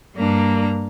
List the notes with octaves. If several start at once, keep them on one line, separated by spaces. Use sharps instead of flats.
G2 G3 A#3 D4 A#5